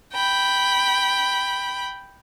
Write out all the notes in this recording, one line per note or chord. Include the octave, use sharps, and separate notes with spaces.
G5 B5